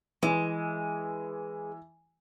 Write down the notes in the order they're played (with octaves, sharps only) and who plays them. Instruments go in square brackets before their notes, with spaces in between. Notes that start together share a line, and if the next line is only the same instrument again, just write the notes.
[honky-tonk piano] E3 [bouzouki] G#3